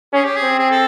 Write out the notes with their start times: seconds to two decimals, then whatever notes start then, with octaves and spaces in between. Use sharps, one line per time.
0.13 C#4 G#4
0.25 G4
0.36 G#4
0.42 C4
0.59 G#4
0.71 A4